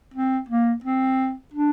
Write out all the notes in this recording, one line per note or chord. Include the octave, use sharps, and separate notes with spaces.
C4
A#3
C4
D4